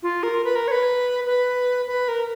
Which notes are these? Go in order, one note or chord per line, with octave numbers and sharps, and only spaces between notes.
F4
A#4
B4
A#4
C#5
B4
B4
B4
A#4